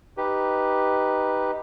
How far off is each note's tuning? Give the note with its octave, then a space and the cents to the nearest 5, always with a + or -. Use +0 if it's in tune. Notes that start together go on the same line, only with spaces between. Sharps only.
D#4 +0 G4 +0 B4 +0